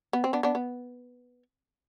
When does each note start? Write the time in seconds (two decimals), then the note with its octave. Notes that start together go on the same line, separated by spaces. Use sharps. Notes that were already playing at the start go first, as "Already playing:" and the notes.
0.13 B3
0.24 C4
0.33 B3 D4
0.43 B3 D4
0.55 B3